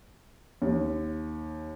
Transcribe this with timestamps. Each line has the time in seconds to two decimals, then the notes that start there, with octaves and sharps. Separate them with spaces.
0.62 D#2